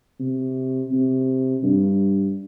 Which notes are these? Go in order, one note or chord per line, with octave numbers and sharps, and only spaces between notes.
C3
C3
G2